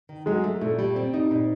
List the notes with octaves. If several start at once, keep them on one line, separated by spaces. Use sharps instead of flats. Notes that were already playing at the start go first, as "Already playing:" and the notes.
D#3
F#3 G#3
A3
A#2 A3
G3
C4
D#4
A#2